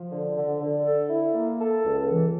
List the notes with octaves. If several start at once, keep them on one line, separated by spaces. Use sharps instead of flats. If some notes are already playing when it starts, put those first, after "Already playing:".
Already playing: F3
D3
D3
D3
A4
E4
A#3
A4
C#2
E3